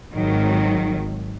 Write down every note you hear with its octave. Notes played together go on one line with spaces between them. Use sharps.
G#1 D#3 F#3